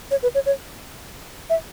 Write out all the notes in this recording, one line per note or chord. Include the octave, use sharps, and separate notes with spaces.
C#5
B4
C#5
C#5
E5